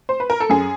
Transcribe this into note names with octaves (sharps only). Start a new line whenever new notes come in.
C5
B4
A#4
A4
F#2 G#4